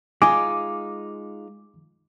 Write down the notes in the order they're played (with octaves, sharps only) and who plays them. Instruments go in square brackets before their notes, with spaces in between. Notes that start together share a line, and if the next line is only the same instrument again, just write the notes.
[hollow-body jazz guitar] G#3 D#4 F4 [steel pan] G#5 D#6 [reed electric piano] D6